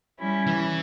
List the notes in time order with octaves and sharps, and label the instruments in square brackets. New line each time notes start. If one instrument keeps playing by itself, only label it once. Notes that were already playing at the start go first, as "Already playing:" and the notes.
[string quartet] G3 C#4 E4
[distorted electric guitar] E3